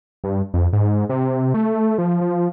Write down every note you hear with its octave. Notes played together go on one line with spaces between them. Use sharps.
G2
F2
G#2
C3
A3
F3
F3